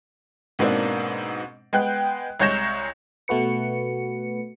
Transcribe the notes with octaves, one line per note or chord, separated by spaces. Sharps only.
G#2 B2 A#3 C4 D4
G#3 B3 G5 F#6
C2 G#3 C#5 G6 A#6 E7
B2 A3 F#4 B4 C#7